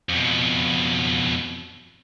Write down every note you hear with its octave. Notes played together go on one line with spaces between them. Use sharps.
F2 B2